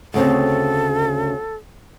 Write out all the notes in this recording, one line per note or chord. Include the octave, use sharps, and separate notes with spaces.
D2 C#3 C4 A4